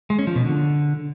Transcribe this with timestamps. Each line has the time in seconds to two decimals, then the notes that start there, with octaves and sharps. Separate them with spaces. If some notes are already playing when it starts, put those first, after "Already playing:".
0.10 G#3
0.19 C#4
0.27 F3
0.36 B2
0.44 D3